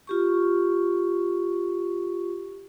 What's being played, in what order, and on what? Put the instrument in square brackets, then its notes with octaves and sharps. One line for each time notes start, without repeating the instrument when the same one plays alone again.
[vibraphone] F4 G4 C#6